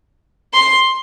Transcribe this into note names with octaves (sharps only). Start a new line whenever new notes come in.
C6